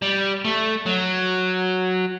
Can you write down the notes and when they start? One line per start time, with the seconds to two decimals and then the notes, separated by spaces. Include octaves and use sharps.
0.02 G3
0.45 A3
0.86 F#3